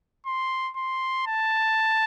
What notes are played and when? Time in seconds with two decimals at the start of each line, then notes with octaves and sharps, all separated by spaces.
0.26 C6
0.76 C6
1.27 A5